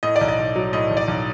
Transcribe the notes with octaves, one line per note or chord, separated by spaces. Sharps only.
A2 D#5
D5
B1
D#5
B1
F#3
A2 D#5
B1
D5
B1